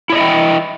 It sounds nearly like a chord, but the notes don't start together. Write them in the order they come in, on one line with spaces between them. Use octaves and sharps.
E4 C#5 D#5 E5 G5